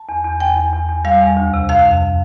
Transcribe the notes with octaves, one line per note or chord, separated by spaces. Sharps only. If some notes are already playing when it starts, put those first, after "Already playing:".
Already playing: A5
E2
E2
E2 G5
E2
E2
E2
G3 F5
E2
D2
C3
F2 F5
F2